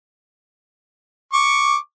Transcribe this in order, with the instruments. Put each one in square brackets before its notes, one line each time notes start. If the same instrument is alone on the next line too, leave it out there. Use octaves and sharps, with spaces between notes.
[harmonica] C#6 D6